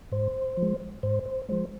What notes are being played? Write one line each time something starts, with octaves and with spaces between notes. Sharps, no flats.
G#2 C5
F3
G#3
G#2 C5
C5
F3 G#3 C5